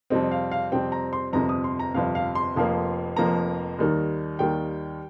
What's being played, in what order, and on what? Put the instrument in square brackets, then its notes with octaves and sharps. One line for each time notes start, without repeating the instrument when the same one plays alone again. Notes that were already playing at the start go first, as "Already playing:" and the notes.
[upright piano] F2 C3 G3 C4 D#5
F5
F5
F2 C3 G3 C4 G5
A#5
C6
G1 F2 C3 A#5
D#6
C6
A#5
G1 F2 C3 F5
F5
C6
F1 F2 F3 A#3
F1 F2 F3 A#3 A#5
D#2 D#3 G3
D#2 D#3 G3 G5